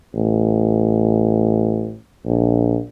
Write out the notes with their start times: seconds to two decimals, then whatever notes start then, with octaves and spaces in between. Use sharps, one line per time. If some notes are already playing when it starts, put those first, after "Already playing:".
0.15 A1
2.25 A#1